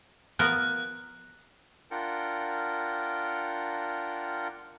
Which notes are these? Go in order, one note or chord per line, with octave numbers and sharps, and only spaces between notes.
F3 B3 A#4 F#6
D4 F4 A#4 F#5 G5